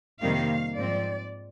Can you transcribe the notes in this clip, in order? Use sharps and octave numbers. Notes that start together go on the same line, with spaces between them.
F2 C3 D#3 G3 A#3 F5
G#2 F3 C4 D5